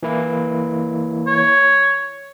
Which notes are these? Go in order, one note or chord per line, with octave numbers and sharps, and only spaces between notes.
E3 A#3 E4
C#5